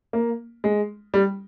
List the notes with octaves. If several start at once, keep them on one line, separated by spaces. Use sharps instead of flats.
A#3
G#3
G3